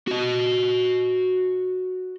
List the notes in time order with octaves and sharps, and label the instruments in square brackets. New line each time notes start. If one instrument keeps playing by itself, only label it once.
[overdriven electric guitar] F#4 D#5